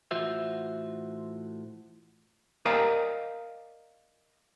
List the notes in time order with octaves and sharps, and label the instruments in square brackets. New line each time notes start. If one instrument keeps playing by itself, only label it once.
[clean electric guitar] A2 E3 F4 F#4 C5 E5
[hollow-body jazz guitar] A#4 D5 D#5 F5 G5 A#5